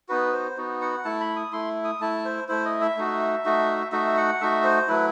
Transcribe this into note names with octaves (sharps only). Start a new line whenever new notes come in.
B3 D#4 F#4 B4
C5
B3 D#4 F#4
F#5
A3 E4 A5
B5
D#6
A3 E4 C6
D#6
A3 E4 A5
C5
A3 E4 C5
D#5
E5
A3 D#4 F#4
A3 D#4 F#4
A3 D#4 F#4 E5
F#5
A3 D#4 F#4 E5
C5
F#3 A3 E4 B4